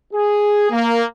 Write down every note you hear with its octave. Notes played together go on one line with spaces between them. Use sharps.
G#4
A#3